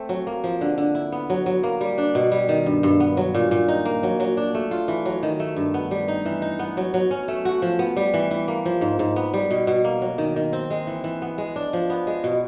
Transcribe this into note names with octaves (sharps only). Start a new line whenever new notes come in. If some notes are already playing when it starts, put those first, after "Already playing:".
Already playing: A3 C4
F#3
A#3
F3
D3
D3
E4
B3
F#3
F#3
A#3
G3
D4
B2
G3
D#3
G2
G2
B3
F#3
A#2
A#2
D#4
A#3
F#3
F#3
D4
A3
F4
E3
F#3
D#3
A3
G2
B3
G3
D#4
E3
D#4
B3
F#3
F#3
C#4
A3
F#4
F3
B3
G3
E3
E3
A#3
F3
G#2
G#2
B3
G3
B2
B2
A#3
F#3
D#3
D#3
C4
G#3
E3
E3
B3
G#3
D4
F3
B3
G#3
B2